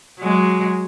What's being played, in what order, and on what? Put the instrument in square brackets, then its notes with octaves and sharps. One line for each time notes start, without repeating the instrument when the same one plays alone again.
[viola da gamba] F#3 G#3